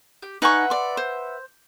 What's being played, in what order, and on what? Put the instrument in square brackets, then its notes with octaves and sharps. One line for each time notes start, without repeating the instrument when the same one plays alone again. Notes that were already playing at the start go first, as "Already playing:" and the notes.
[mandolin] G4
[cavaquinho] D#4 G#5 C#6 [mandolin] B4 E5 F#5
[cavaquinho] D5 C6
C5